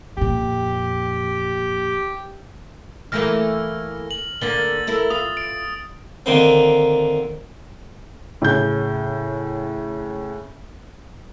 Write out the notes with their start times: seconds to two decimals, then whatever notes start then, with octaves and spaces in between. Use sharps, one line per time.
0.17 F2 A#2 G4
3.12 E3 A3 A#3 F6 A#6
4.11 F#7
4.41 D3 A#3 A6 G7
4.87 E4 A4 A#4
5.10 F4 B4 D#6
5.37 D7
6.26 D3 D#3 A#3 C4
8.42 A2 C#3 G6